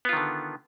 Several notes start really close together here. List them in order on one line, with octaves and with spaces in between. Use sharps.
B3 F4 D#3 D3